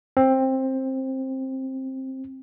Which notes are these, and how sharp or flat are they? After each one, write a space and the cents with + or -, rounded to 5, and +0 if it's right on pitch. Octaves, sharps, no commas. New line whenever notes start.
C4 +15